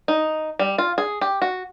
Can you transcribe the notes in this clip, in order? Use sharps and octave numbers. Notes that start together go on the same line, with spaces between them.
D#4
G3
F4
G#4
G4
F#4